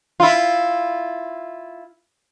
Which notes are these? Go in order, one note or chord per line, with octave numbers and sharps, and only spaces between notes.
E4 F4